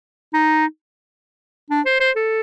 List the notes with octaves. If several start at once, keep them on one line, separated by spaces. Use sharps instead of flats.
D#4
D4
C5
C5
A4